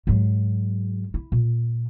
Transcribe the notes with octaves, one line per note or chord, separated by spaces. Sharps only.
G#2 F#3
E4
A#2